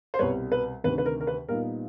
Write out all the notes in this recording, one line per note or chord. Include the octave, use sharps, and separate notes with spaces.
C5
C2 B2 G3 B4 C#5
B4
D2 C3 D#3 B4
B4
A#4
A#4
B4
A#2 G3 B3 D#4 A#4